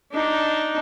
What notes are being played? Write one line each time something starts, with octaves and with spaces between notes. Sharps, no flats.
D4 D#4